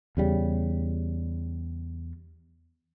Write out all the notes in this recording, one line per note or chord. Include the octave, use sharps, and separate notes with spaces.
E2 C#3 G3